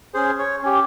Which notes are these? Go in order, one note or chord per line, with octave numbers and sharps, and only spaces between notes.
C#4 G#4 C5
C#5
C#4 G4